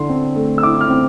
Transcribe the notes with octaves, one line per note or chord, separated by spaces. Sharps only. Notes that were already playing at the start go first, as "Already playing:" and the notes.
Already playing: D3 E4 C6
C4
A3
E6
E4 D6
F6
C4